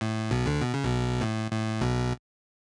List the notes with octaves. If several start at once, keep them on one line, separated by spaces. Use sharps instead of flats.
A2
B1 B2
D2 D3
B2
C#3
B1 B2
A2
A2
B1 B2